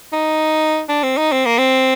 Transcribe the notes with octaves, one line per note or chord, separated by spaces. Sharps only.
D#4
D4
C4
D#4
C4
A#3
C4